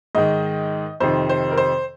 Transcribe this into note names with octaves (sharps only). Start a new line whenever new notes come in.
G#2 D#3 D#5
F2 C3 D#3 C5
C5
A#4
C5